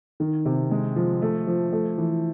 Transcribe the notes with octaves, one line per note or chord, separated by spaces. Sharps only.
D#3
C3
G#3
F3
A3
F3
A3
E3